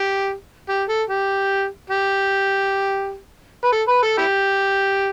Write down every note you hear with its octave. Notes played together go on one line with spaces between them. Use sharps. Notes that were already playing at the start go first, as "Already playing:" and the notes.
Already playing: G4
G4
A4
G4
G4
B4
A4
B4
A4
E4 G4